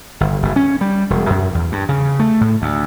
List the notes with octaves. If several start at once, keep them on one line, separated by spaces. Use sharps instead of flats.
G1
F#1
C#4
G3
E1
F#2
E2
G2
C#3
A3
A2
D2